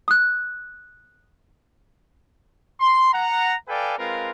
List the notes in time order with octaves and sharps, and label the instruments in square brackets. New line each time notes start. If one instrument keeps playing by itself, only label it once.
[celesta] D#6 F#6
[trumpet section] C6
F#5 A#5
A4 B4 D5 F5 G5 G#5
G#3 C4 F4 A#4 B4 F5